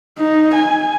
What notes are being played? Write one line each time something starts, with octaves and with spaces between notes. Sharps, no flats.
D#4
G#5